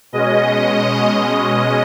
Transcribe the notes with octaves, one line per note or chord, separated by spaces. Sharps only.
B2 G#3 C#4 D#5
D#5